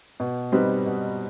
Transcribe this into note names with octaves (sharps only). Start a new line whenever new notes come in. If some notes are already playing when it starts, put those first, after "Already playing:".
B2
G3 C4 D#4 B4
B2